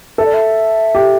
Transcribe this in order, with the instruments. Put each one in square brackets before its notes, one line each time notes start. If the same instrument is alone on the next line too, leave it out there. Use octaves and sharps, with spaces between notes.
[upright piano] A4 [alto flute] E5
[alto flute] D5
E5
[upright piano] G4